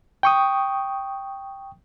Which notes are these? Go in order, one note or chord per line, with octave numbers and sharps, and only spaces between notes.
G5 C#6 D#6